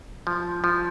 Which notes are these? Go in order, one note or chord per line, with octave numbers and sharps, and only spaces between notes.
F3
F3